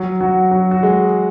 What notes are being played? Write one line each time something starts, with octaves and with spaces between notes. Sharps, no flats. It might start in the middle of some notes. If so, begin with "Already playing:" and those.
Already playing: F#3 F#4
F#3 F#4
F#3 F#4
F#4
G#3 G#4